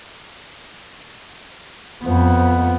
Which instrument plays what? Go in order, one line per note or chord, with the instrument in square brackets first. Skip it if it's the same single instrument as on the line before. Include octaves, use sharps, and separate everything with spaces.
[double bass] F2 B3